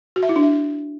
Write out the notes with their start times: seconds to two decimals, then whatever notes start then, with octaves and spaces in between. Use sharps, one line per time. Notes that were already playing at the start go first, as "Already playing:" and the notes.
0.16 F#4
0.23 E5
0.29 E4
0.36 D4
0.42 E5